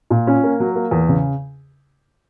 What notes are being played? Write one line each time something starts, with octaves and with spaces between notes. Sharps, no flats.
A#2
C#4
A#3
F#3
A#3
E2
C#3